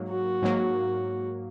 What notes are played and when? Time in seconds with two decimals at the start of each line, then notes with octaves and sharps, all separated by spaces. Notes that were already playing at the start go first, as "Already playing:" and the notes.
Already playing: G#2 F#3 A#3
0.09 F#4
0.42 G#2 F#3 A#3